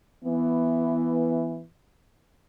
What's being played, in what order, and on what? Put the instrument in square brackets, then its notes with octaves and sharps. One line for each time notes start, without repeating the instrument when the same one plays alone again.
[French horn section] E3 B3